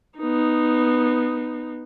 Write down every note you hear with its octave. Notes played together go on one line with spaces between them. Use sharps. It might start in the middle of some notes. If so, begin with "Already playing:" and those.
B3 D#4